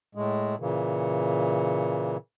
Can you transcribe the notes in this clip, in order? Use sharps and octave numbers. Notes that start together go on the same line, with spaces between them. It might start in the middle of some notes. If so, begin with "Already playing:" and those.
A2 G#3
A#2 C#3 E3